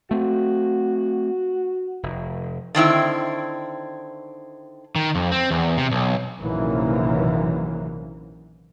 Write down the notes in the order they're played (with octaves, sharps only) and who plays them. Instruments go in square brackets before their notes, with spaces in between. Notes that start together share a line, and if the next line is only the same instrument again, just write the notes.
[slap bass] A3 C4 [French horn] F#4
[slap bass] F1
[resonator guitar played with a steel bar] D3 D#3 C4 E4
[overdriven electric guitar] D#3
F2
C4
E2
C3
B1
[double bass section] A#1 F#2 C3 D#3 E3 A#3